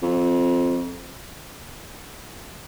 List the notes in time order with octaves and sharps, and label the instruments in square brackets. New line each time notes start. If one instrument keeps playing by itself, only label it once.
[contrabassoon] F2